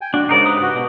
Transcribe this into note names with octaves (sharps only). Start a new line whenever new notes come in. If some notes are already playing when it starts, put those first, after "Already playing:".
G5 G#5
D4 F#4
G#2 C#3 D#4 A#4 D5
G4 B4 D#6
F#4
B2